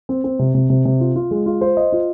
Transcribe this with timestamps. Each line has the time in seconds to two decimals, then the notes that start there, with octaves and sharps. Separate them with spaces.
0.09 C4
0.24 C4
0.39 C3
0.55 C3
0.70 C3
0.85 C3
1.00 F4
1.16 F4
1.31 G#3
1.46 F4
1.61 C5
1.77 D#5
1.92 F4